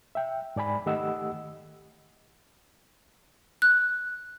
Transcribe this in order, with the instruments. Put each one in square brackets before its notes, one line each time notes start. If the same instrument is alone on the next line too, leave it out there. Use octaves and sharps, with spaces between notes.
[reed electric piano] E5 G5
G#2 D5 G#5 B5
D#3 A3 G4 D#5 F#5 E6
[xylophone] F#6